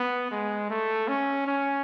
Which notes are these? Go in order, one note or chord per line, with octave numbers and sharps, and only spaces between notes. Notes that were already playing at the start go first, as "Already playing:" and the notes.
Already playing: B3
G#3
A3
C#4
C#4